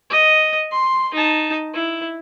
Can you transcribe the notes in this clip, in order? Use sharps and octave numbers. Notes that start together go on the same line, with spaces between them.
D#5
C6
D#4 A5
E4